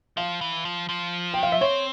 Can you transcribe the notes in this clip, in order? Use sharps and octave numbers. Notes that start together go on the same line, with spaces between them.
F3 F5
E3
F3
F3
G5
F5
E5
C4 C#5